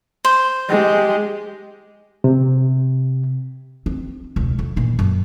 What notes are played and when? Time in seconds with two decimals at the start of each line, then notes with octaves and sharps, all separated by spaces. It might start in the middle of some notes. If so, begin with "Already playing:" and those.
0.25 C5
0.69 G#3 G4
2.24 C3
3.86 C4
4.36 E1 C#2
4.59 F2
4.76 A#2 E3
4.99 F#2